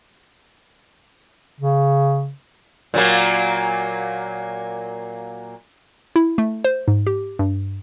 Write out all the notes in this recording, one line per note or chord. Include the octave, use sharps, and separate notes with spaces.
C#3
A#2 F#3 A#3
E4
A3
C5
G#2
G4
G2